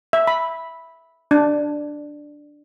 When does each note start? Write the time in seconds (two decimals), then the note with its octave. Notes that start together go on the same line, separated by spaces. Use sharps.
0.13 E5
0.27 B5
1.31 D4